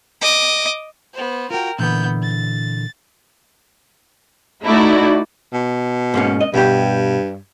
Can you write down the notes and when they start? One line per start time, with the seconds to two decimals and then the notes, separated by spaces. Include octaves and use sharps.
0.22 D#5 D6
1.13 B3 C5
1.50 F4 F#4 A#4 G5
1.79 A#2 D3 E3 B3 G6
2.22 A6
4.65 A3 D#4 E4 F#4 D5
5.53 B2
6.14 G#2 A#3 C#4
6.41 D#5
6.54 G2 B2 G4